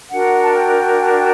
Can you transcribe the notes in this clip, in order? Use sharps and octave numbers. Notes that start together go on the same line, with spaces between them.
D4 F#4 A#4 F#5
A5
G5